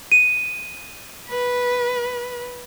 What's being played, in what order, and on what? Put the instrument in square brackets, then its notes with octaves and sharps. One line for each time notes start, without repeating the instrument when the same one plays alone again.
[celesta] D#7
[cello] B4